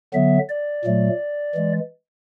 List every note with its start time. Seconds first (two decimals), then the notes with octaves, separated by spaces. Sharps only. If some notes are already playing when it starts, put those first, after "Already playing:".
0.14 D3 F#3 B3 E5
0.49 D5
0.85 A#2 F#3 A3
1.55 E3 G#3